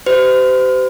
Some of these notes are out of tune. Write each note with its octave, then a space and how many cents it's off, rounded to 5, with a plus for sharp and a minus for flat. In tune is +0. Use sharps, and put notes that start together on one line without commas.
G4 -30 C5 -40